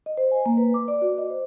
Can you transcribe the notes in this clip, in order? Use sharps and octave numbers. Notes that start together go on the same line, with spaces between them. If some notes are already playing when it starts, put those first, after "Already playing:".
D#5
C5
G#5
A#3
B4
D6
D5
F#4
D#5
C5